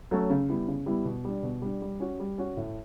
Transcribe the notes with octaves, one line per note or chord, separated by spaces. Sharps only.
F#3 A3 C#4
C#3
G3 B3 E4
C#3
G3 B3 E4
B2
G3 D4
B2
G3 D4
G3
C#4 F#4
G3
C#4 F#4
A2